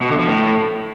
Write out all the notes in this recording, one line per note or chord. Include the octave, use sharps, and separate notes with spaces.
B2
D3
F3
A2